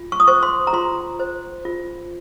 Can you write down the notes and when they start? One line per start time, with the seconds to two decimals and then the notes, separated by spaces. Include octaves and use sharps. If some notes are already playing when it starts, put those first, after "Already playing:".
Already playing: F4
0.12 C#6
0.20 D#6
0.27 C5 C#6
0.43 C6
0.67 A#5
0.73 F4 C6
1.19 C5
1.65 F4